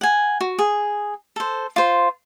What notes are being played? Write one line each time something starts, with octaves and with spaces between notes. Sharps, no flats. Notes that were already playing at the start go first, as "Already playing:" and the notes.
F#5 G#5
F#4
G#4
A4 C5
F4 C5